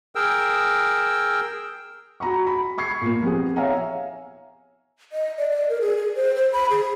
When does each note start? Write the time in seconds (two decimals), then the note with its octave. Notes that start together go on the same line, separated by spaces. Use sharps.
0.15 G#4 A#4 G5 E6
2.20 F#4 A#5 B5 C#6
2.47 B5
2.78 B5 C#6 G#6 C7
3.02 A#2 A#3
3.22 F3 B3 C4 G#4
3.56 C#5 E5 F5 G#5 A#5
5.12 D#5
5.38 D5
5.50 D5
5.69 A#4
5.81 G#4
5.96 G#4
6.16 C5
6.35 C5
6.53 B5
6.70 G#4